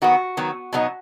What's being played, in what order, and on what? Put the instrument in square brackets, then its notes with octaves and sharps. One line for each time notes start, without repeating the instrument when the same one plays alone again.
[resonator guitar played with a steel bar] D#3 F#3 B3 F#4
D#3 F#3 B3
B2 F#3 B3 D#4